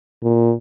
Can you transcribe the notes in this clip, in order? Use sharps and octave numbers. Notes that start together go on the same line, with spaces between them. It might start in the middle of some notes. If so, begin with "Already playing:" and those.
A#2